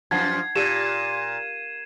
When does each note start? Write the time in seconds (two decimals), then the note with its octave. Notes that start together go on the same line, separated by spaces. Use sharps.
0.11 F#2 F3 D#4 F#5 A5 G#6 C7
0.56 A#2 D#4 G4 E6 D#7 E7